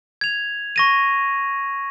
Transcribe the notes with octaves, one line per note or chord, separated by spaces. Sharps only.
G#6 F7
C#6 A#6 D#7